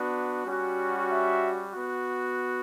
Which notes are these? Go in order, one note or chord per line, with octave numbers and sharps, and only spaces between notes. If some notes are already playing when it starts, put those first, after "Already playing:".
Already playing: B3 D4 F#4
G3 C#4 F#4
E5
B3 F#4